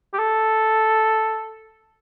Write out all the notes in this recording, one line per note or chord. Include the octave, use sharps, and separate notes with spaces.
G4
A4